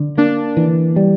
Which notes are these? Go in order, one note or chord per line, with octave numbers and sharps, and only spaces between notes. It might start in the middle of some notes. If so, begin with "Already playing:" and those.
Already playing: D3
A#3 D4
E3
G3